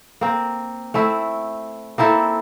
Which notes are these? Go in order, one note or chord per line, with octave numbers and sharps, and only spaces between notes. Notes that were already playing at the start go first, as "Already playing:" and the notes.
A#3 C4
A3 C4 E4
A#3 C4 E4 A4